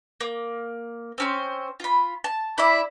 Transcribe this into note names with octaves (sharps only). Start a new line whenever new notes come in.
A#3
C4 C#4 C5
F4 B5
A5
E4 D5 E5